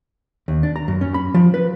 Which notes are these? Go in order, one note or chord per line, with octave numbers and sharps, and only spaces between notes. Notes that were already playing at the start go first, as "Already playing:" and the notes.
D#2
D4
A#5
F#2
C#4
B5
F3
B4